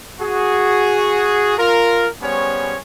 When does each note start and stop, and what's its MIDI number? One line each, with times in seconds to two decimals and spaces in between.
0.21 1.54 66
0.21 1.54 68
1.58 2.07 65
1.58 2.07 70
2.22 2.77 55
2.22 2.77 59
2.22 2.77 61
2.22 2.77 68
2.22 2.77 72
2.22 2.77 73